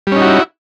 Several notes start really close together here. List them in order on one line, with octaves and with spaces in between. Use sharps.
G3 C#4 D#4 F#4 E4